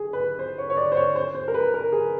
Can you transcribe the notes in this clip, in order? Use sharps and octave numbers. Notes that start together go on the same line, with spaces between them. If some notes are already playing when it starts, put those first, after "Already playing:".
Already playing: G#4
B4
C5
C#5
C#5
D5
C5
C#5
C5
C5
A#4
B4
A#4
G#4